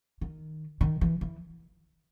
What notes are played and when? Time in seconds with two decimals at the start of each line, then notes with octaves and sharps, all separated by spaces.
0.21 D#3
0.81 D#3
1.01 E3
1.21 E3